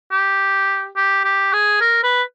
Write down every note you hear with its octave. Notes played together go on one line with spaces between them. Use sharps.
G4
G4
G4
G#4
A#4
B4